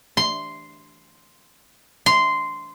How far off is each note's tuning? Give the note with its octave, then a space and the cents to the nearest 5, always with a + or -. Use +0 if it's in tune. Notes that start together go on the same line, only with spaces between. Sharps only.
C6 -5
C6 -10